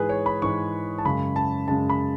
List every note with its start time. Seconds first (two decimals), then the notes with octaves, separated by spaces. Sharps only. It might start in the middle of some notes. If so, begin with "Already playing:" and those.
Already playing: G#2 E3 G#3 G#4 B4
0.09 C#5
0.26 B5
0.42 G#2 E3 G#3 C#6
0.98 A5
1.05 F#2 C#3 G#3 B5
1.36 A5
1.68 F#2 C#3 G#3 A5
1.89 B5